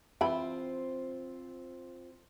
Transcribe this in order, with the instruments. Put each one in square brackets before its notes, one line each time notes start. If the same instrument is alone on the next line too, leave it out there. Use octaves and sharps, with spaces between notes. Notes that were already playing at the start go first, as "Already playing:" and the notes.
[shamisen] E3 G5 B5 [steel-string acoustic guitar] C4 F4 C5